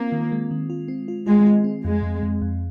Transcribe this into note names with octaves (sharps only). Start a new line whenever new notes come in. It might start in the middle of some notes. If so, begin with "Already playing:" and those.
Already playing: A#3 C4 F4
D#3
G#3
D#3
F4
C4
F4
G#3 F4
F4
C4
F2 G#3
F2
F2
F2